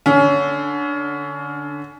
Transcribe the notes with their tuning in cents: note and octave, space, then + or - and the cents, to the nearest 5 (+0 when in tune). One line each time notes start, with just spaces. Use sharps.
D3 +0 C#4 +25